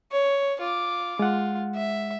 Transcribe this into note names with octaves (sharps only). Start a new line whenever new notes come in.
C#5
F4 D6
G#3 F4 F#5
E5